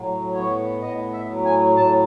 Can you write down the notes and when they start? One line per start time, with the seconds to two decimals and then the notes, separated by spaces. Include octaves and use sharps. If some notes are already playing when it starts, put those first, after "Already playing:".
Already playing: A2 F#3
0.34 B3 C#5
0.82 A2 D#5
1.13 E5
1.29 F#3
1.45 G#5
1.77 A2 A5